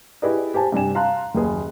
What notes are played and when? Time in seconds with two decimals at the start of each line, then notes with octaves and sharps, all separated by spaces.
0.22 E4 G4 G#4 B4 D5 D#5
0.54 G4 C5 G#5 A5
0.72 G2 C3 D4 G#5 E7
0.95 F5 A5 A#5 C6 F#6
1.35 F#1 D#2 G#4